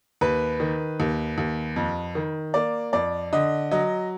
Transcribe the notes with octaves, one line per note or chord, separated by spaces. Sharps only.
D#2 B4
D#3
D#2
D#2
F2
D#3
A#3 D5
F2 D5
D3 D#5
F#3 D#5